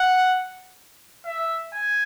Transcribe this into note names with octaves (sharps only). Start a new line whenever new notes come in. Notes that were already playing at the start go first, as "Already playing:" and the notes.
Already playing: F#5
E5
G#5